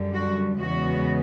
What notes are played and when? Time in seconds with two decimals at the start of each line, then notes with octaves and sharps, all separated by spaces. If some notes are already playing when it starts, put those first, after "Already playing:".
Already playing: F#2 D3 G3
0.14 F#4
0.60 E2 C#3 E3 G#3 B3 F#4